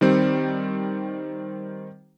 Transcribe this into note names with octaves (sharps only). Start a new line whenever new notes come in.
D#3 G3 C4